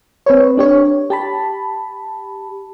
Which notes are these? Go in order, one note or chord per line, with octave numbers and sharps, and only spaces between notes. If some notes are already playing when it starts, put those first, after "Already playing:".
C4 B4 C#5
D4 G4 C#5
G4 A5 B5